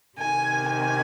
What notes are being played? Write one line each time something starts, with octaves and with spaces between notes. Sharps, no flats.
C3 D#3 G#5
G#5